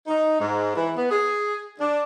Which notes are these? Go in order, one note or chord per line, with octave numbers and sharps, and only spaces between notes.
D#4
G#2
E3
B3
G#4
D4